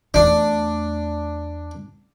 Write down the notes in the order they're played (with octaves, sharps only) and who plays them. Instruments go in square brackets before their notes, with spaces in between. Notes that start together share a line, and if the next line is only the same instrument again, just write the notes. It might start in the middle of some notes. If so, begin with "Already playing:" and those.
[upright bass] E2 A3 [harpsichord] D4